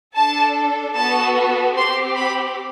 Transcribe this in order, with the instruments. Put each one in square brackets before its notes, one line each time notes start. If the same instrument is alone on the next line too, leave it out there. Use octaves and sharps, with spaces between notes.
[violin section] D4 A4 A5
B3 F#4 A4 A5
C4 G4 C6
B5